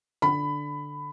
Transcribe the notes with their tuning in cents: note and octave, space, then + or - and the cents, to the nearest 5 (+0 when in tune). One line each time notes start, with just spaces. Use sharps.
D3 +0 B5 +15